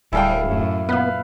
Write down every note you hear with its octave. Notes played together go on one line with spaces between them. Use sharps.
D1 G3 E4 G#4 A4 F5 G5
F#2 A2
A#2 B3 B4 F5